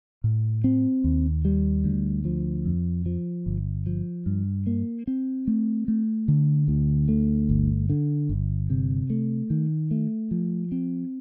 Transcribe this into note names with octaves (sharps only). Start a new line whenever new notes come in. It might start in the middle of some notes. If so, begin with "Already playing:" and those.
A2
C4
D#2
G3
D2
F3
F2
F3
G1
F3
G2
A#3
C4
A3
A3
D3
D2
A3
G1
D3
G1
C3
A3
D#3
A3
F3
C4